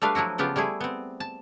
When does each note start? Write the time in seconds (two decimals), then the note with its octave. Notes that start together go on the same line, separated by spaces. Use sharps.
0.02 G3 A3 D4 B4 F5
0.15 F3 F#3 E4 F#4
0.38 C#3 F3 B3 F4 G4
0.56 G3 A3 E4 G#4
0.80 B3 C4
1.20 A5